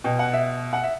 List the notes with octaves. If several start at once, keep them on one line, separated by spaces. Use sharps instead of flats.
B2 G5
F#5
E5
F#5
E5